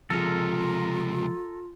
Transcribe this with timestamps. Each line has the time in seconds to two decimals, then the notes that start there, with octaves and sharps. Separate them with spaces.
0.10 C#2 C3 F3 G#3 F4 A4 A#4